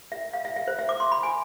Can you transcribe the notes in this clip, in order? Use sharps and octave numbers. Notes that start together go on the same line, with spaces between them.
E5
F5
E5
E5
C5
E5
D6
C6
B5
G#5